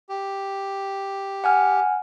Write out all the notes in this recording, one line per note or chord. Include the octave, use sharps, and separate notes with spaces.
G4
F#5 G#5 F6